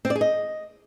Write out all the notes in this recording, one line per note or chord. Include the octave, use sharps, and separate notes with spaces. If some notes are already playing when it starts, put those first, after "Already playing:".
C4
D5
G#4
D#5